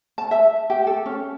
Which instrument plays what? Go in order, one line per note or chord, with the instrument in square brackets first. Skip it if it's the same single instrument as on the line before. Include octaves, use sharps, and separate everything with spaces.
[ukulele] A5
E5
G4
A4
C#4